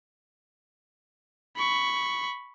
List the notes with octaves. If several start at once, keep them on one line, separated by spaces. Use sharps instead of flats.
B5 C#6